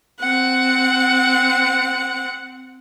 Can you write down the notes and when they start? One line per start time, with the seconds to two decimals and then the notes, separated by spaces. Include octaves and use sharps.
0.20 C4 F#5